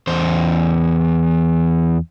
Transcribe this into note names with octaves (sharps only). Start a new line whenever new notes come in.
E2 C5